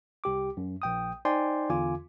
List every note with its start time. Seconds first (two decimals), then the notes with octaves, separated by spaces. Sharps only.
0.24 C2 G4 D6
0.57 F#2
0.82 A#1 G5 D#6
1.25 D#4 C5 D5 G5 G#5 C6
1.70 E2 D3 F4 G#5 D6